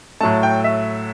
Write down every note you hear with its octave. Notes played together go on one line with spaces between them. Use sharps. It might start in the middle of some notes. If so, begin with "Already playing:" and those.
A2 F#3 A3 A5
G5
E5